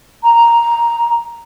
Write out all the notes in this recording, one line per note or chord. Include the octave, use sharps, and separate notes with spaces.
A#5